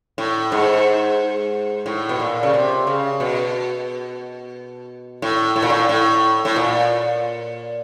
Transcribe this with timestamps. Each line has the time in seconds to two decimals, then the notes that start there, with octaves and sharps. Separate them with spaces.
0.18 A2
0.52 G#2
1.86 A2
2.09 B2
2.20 A#2
2.43 C#3
2.53 C3
2.87 C#3
3.20 B2
5.22 A2
5.56 A2
5.62 A#2
5.70 A2
5.89 A2
6.45 A2
6.56 A#2